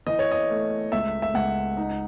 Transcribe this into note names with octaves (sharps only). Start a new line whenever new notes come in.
E3 D#5
C#5
D#5
A3
C#2 E5
E5
C#2 F#5
D#4